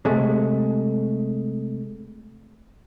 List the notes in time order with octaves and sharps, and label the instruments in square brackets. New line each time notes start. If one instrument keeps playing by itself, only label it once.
[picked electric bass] C3 G#3 A3